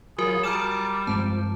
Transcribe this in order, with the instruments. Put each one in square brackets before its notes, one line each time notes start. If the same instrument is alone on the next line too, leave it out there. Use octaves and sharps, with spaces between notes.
[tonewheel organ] F#3 F4 [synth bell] F#4 A#4 [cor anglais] G#4
[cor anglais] G3 [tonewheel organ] A5 D6 [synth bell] A#5 F6 E7
[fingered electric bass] G2 G#3 C4 [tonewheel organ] F3 [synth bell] A5